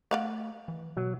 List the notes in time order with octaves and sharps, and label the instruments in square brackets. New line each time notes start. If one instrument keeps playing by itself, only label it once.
[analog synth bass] A3 [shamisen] D5 F5 F#5
[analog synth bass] E3
[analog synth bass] B2 [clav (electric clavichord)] F#3